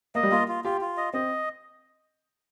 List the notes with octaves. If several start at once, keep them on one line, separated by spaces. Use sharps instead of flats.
A#3 D#5
G3
A#3 F4
F4
F4 G4
F4
D#5
C4 D#5